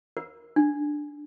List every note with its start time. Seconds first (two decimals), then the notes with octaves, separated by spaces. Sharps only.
0.17 A#4
0.56 D4